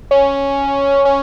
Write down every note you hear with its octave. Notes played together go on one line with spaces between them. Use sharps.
C#4
C#4